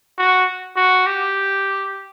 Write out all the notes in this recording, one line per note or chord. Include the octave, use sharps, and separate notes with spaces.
F#4
F#4
G4